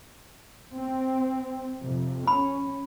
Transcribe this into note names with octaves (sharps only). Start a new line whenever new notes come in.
C4
F2 C3
C#4 B5